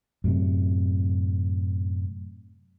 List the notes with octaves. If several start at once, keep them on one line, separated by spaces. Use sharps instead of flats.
F#2 A2 C3